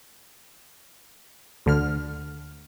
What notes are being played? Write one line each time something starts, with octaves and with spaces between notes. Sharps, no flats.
D2 D3 F6